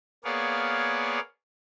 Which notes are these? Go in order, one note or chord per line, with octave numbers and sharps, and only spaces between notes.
A#3 B3 G#4 C#5 D5 F5